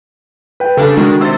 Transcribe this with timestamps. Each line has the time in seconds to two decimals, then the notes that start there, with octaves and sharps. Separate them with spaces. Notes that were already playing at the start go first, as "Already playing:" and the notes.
0.60 B4 G5
0.77 C#3 G3 D4 A4
0.97 D#3 G3 G#3 D4 F#4
1.21 C3 C5 E6 A6